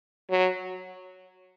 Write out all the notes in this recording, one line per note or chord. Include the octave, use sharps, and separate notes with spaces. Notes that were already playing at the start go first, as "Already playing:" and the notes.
F#3